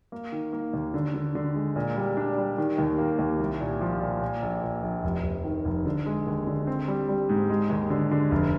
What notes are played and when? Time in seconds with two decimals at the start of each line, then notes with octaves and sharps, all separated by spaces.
0.12 A#3
0.32 D#3
0.53 A#3
0.73 D#2
0.94 D3
1.14 D3
1.35 D3
1.55 G#3
1.76 A#2
1.96 G3
2.17 D4
2.38 G3
2.58 D#3
2.78 D#2
2.98 A#3
3.19 D#2
3.40 C2
3.61 A#2
3.81 F3
4.01 A#2
4.22 A#2
4.43 A#1
4.63 A#2
4.83 A#1
5.04 F1
5.24 F1
5.45 D#3
5.65 F1
5.86 D3
6.06 G#3
6.27 D#2
6.47 D3
6.67 C4
6.88 G3
7.09 G3
7.29 G#2
7.50 G#3
7.70 D#2
7.90 D3
8.11 D3
8.31 F1